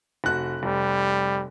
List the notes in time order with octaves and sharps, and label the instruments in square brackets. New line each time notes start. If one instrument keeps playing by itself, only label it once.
[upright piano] F1 F#4 F#6
[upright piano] F1 [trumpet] G3